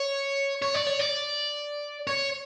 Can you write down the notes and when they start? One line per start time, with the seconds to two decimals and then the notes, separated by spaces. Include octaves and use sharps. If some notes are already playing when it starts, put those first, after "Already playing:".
Already playing: C#5
0.62 C#5
0.74 D5
0.86 C#5
0.99 D5
2.07 C#5